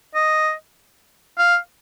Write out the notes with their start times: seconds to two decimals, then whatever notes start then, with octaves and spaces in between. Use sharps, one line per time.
0.15 D#5
1.38 F5